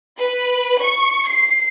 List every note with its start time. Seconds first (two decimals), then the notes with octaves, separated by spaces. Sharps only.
0.18 B4
0.80 C#6
1.28 C7